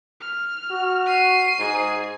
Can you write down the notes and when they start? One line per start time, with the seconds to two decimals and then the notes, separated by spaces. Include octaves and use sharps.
0.20 F6
0.71 F#4
1.07 C7 D#7
1.59 G#2 G#4